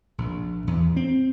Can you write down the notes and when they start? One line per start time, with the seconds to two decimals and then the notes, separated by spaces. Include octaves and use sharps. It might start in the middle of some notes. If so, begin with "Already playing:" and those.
0.18 A#1
0.67 E2
0.96 C4